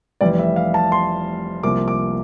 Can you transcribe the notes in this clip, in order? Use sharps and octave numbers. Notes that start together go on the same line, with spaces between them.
F1 F2 C3 E3 G3 D5
E5
F5
A5
C6
C2 C3 F3 A#3 D6
D6